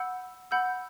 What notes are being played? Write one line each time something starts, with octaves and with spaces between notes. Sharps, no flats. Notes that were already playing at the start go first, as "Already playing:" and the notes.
Already playing: F#5 B5 E6 G6
F#5 B5 E6 G6